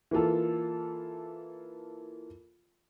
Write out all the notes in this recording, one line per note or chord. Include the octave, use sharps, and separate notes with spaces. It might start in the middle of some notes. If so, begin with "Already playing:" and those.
E3 A#3 F4 A4